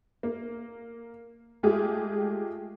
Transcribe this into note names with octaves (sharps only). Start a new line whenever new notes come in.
A#3
G#3 A3 F4 G4 G#4